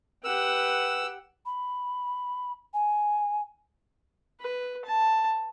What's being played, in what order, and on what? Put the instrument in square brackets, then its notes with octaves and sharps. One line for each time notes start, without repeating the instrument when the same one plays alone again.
[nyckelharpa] G4 F#5 [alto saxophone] B4 [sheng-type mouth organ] E6
[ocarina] B5
G#5
[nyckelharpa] B4
A5